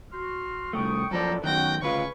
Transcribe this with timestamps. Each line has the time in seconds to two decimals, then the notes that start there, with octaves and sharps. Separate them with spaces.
0.11 F#4 C6 F6
0.73 C2 A3 G5 C#6 D#6
1.11 F#2 F3 A4 C5 D5 A#5
1.44 F#2 D#3 F#4 F#5 G5 A#6
1.82 D2 C#3 C#4 F4 B4 C#6